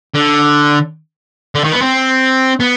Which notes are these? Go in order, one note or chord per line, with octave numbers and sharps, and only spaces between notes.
D3
D3
D#3
B3
C4
B3